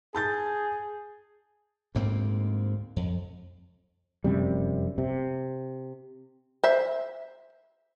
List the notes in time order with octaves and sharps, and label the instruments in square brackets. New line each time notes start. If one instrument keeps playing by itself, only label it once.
[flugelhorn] G#4 [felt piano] A5 G6 A6
[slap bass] D2 G#2 A#3 C4
F2
[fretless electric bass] F1 F#2 C3 G3
C3
[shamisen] C5 E5